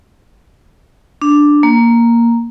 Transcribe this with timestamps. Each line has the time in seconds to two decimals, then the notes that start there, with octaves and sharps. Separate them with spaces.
1.22 D4
1.63 A#3